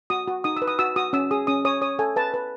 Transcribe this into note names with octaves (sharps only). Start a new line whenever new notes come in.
F#4 D#6
F#4
D#4 D#6
E6
B4
D#6
F#4 E6
F#4 D#6
C#4 E6
G#4 D#6
C#4 D#6
C#5 D#6
C#5 D#6
A4 G#5
B4 A5
B4